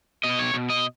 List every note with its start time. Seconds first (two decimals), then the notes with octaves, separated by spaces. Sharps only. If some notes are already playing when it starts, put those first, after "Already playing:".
0.24 B2 D#5
0.39 C#5
0.54 B2
0.70 D#5